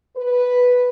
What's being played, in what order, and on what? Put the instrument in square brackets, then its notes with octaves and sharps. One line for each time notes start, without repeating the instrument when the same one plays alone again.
[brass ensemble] B4